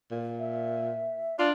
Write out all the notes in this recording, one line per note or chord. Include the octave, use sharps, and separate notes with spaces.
A#2
E5
D4 F4 D5